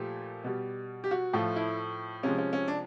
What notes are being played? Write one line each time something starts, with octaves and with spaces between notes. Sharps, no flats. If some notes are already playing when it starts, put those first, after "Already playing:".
Already playing: A#2 F3 A3 G4
B2 G3
G4
F#4
A2 F3 A3 F4
E4
C3 F3 G#3 C#4
C#4
C#4
D4